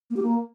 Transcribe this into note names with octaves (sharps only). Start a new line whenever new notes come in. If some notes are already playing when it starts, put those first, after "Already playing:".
A#3
G4
A#3